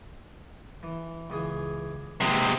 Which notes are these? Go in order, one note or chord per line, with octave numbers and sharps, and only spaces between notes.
E3
C#2 E3 G#4
A#1 C3 G#3 B3 F#4